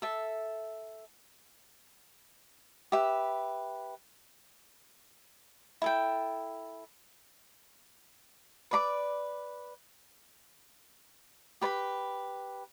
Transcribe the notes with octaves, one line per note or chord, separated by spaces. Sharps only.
A4 E5 A5
G4 B4 E5 B5
E4 A4 G5
B4 D5 B5 D6
G4 B4 D5 B5